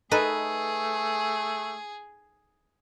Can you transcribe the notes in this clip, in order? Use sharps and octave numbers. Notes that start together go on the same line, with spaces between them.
A3 D#4 G#4 A4 B4